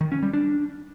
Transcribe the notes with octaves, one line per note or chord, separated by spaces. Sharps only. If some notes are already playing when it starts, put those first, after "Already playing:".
D#3
C#4
G3
D4